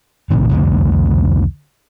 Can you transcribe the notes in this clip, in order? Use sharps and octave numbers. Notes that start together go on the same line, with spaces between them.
A#1 A2 C3 D#3
C2 F2 D3 A3